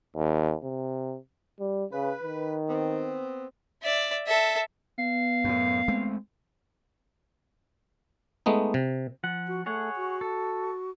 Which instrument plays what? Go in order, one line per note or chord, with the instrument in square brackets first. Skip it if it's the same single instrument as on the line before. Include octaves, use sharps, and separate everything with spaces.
[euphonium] D#2
C3
G3
[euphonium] C#3 [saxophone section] B4
[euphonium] D#3
[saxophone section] B3 C4
[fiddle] D5 E5
A4 E5
[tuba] B3 [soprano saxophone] F5
[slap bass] F#2 A2
G#3 A3 C4
[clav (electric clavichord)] G#3 A3 B3 D#4
C3
[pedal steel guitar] F3 F#5
[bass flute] F#4
[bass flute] A3 [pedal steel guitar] G#4 C#5 F#5
[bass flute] F#4
[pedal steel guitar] A4